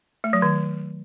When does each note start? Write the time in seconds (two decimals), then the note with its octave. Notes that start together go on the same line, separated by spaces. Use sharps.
0.24 A3
0.33 F#3
0.42 D#3